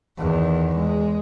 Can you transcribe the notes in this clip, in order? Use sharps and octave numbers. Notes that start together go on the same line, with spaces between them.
E2 D#3
G#3